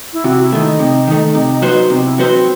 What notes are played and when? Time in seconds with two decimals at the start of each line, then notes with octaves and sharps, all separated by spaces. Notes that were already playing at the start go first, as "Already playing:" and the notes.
0.13 E4
0.24 C3 F#4
0.43 E4
0.52 D#3 A3
0.62 D#4
0.79 C3
1.07 D#3 A3
1.35 C3
1.62 F#3 B3 F#4 C5
1.90 C3 D#4
2.04 E4
2.17 F#3 B3 D#4 F#4 C5
2.31 C4